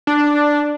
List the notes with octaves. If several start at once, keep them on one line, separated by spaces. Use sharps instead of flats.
D4